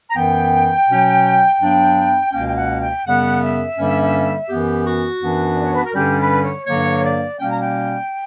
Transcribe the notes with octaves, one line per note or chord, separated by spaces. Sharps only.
A#5
F#2 E3 B3 G5
B2 F#3 C#4
G2 F#3 B3 D4
C#2 B2 A#3 C#4 G5
G5
F#5
G5
F#2 C#3 G3 B3 F#5
E5
G2 D3 G3 A#3 C#4
F#2 E3 B3 G4
F#4
F#2 E3 B3 D4
D5
C#5
B4
A#4
G2 D3 G3 C#4 G4
B4
C#5
G2 D3 F#3 A#3 C#5
D5
B2 G3 A#3 C#4 G5
A#5
G5